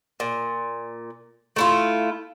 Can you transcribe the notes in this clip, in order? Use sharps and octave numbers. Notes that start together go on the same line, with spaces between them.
A#2
A3 E4 F4